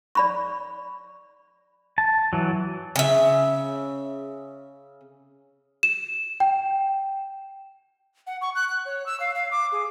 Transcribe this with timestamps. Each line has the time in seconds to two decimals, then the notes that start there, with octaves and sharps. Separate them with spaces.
0.15 D5 B5 C#6
1.98 A5
2.33 E3 F#3
2.96 C#3 E5
5.83 E7
6.40 G5
8.27 F#5
8.41 C#6
8.55 F#6
8.68 F#6
8.85 C#5
9.06 E6
9.20 F5
9.35 F5
9.51 D6
9.72 G#4